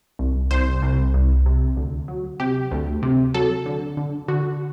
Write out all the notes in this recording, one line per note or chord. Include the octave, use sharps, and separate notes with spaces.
C2
C2 C5
C2
C2
C3
D2
F#3
C3 G4
D2
C3
F#3 A4
D3
D3
D3 F#4